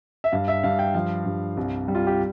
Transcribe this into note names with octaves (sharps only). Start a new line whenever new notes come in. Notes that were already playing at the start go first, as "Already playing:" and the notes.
E5
G2 F5
E5
G2 F5
G5
F3 F5
G2
C2
G3
F4
G4